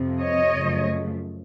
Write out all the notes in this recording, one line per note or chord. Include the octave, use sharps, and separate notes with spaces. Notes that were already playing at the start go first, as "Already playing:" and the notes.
Already playing: F2 C3 F3
C#5 D#5
F#2 C#3 F3 A3